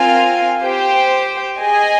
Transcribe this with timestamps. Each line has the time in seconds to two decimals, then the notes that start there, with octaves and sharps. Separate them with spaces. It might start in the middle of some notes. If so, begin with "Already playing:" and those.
Already playing: C4 F4 A#4 F5 G#5
0.63 G4 C5 G5
1.60 G#4 D#5 G#5